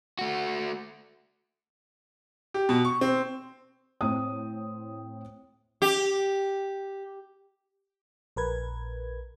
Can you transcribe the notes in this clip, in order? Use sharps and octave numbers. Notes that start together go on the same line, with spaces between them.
A3 F#4
G4
B2
C#6
C4
A2 C4 D#6
G4
A#1 A#4 B4 G#6